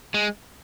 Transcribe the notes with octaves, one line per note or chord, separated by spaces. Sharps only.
G#3